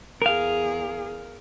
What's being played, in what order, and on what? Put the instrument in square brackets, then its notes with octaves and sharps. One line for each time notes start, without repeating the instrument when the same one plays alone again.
[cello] E2 G#4 [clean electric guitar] A#4 F5